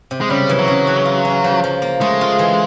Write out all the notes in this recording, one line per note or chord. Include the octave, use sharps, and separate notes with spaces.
C3
G#3
C#3 G3
E3
F#3
C#3
E3
F4
C#4
F3
F3
A#3
G#3 A3
F4
E3